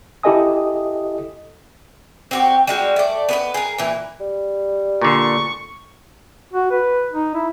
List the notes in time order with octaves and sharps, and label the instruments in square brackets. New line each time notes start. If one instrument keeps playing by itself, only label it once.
[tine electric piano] E4 G4 A4 D#5 G#5 D#6
[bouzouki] C4 F#4 G4
G3 G#3 F#4
A3 D5
B3 B4 D#5
G#4 A#4
A#2 E3
[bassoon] G3
[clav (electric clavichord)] A#2 D3 [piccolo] C#6
[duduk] F#4
B4
D#4
E4